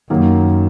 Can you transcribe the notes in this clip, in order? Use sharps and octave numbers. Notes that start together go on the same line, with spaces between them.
F#2 D#3 F#3 A#3